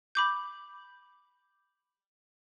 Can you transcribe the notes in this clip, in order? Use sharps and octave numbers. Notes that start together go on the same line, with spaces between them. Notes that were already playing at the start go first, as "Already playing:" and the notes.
B5 D6 G6